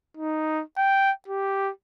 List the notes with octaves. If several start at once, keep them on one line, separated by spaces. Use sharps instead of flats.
D#4
G5
G4